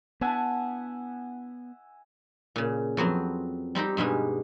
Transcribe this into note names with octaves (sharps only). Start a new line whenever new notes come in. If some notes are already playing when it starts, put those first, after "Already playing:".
B3 D4 E4 E5 F#5 G#5 A5
A#2 C#3
F2 F#3 B3 C4
G3 C4 D#4 G4
G2 B2 G3 G#3